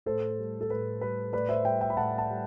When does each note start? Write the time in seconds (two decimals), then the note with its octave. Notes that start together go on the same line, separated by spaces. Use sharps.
0.06 A2 A4 C5
0.38 G3
0.61 A4
0.70 A2 B4
1.01 G3 B4
1.33 A2 B4 D5
1.49 C5 E5
1.65 G3 E5 G5
1.81 E5 G5
1.90 B5
1.97 A2 F#5 A5
2.18 F#5 A5
2.29 G3